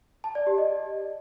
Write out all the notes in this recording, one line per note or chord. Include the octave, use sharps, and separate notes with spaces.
A5
D5
G4
D#5